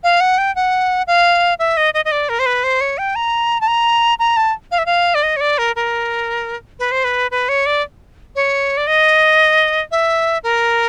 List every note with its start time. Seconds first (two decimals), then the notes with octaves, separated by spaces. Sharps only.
0.04 F5
0.20 F#5
0.38 G5
0.56 F#5
1.07 F5
1.59 E5
1.77 D#5
1.94 D#5
2.05 D#5
2.12 D5
2.29 A#4
2.39 C5
2.46 B4
2.64 C5
2.81 C#5
2.98 G5
3.16 A#5
3.61 A5
3.67 A#5
4.19 A#5
4.37 A5
4.71 F5
4.78 E5
4.86 F5
5.15 D5
5.23 D#5
5.36 C#5
5.41 D5
5.58 A#4
5.76 A#4
6.79 B4
6.92 C5
7.04 B4
7.31 B4
7.49 C#5
7.66 D5
8.36 C#5
8.77 D5
8.87 D#5
9.91 E5
10.43 A#4